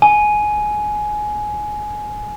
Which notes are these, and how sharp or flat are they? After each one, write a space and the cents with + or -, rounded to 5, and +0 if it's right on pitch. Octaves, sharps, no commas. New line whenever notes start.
G#5 +15